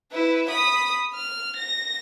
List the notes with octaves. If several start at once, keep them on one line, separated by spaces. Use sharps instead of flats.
E4 B4
B5 D#6
F6
A#6